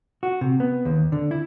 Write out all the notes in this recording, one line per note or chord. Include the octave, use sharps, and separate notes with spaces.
F#4
C3
B3
D#2
D3
E4